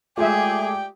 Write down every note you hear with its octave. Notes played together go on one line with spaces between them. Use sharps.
G#3 A3 F4 G4 G#4 D5 E5 G5